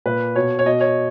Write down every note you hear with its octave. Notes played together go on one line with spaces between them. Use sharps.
A#2 B4
B2 C#5
C#5
B2 D#5
C#5